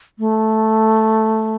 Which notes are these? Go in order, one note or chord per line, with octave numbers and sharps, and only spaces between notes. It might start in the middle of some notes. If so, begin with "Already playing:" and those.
A3